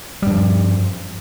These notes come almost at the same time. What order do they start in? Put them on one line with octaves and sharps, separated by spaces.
G3 G2 F3